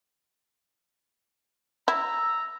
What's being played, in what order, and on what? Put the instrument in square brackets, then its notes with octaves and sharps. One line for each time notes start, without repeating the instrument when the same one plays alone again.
[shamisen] E4 [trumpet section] A#5 [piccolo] E6